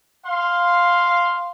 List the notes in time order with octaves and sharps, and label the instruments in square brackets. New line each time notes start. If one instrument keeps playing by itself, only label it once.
[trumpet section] F5 C6